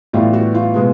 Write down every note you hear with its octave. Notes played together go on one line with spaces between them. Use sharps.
A2 E3 G3 B3 F4
F#4
F4
B2 G#3 B3